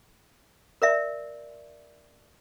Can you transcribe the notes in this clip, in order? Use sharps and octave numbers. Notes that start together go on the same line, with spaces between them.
A#4 D5 E5